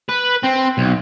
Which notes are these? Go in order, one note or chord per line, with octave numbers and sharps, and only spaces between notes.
B4
C4
B1